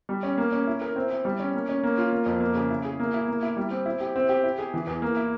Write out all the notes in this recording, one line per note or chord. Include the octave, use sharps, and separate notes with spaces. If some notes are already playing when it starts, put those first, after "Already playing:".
G3
C#4
A#3
C#4
E4
A#4
C4
E4
G3
C#4
A#3
C#4
A#3
F4
A#3
F2
A#3
C#3
E4
G#4
A#3
E4
A#3
E4
G3
C4
E4
G4
C4
G4
E4
G#4
E3
E2
A#3
E4